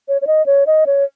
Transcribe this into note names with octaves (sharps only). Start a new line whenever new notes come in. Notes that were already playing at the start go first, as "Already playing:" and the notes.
C#5
C#5
D#5
C#5
D#5
C#5